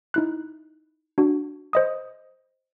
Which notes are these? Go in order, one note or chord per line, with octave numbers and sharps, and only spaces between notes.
D#4 E4 F#6
D4 F#4
C5 D#5 D#6